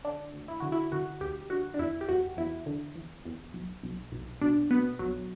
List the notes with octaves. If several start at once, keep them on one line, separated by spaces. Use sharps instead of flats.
D3 D4
D2
E4
D3 F#4
E4
D3 F#4
D2 G4
D3 F#4
D4
E2 E4
G4
E2 F#4
E2 E4
D3
E2
E2
B1
B1
B1
B2 D4
B2 B3
B1 F#3